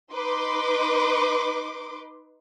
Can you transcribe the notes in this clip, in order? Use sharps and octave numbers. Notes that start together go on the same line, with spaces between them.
D#4 B4 C6 D6